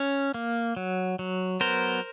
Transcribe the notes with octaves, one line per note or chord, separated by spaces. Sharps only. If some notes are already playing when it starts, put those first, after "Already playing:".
Already playing: C#4
A#3
F#3
F#3
B3 A#4 C5